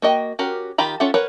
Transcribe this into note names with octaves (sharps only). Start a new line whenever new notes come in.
A#3 F#4 D#5 G5
C#4 F#4 G4 A#4
D#3 F4 G4 A#5 B5
C#4 F4 A4 E5 F#5
A#4 B4 C#5 F#5